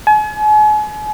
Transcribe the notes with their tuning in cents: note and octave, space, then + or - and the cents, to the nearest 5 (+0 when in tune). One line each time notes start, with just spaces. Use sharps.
G#5 +40